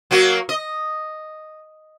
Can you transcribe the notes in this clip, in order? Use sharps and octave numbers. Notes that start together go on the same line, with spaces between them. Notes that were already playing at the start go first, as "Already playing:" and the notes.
F#3 A#3 F#4
D#5